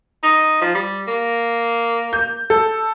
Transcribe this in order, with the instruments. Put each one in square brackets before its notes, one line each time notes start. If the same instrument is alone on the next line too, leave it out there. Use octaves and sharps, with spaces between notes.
[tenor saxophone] D#4
F3
G3
A#3
[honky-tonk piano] G6
A4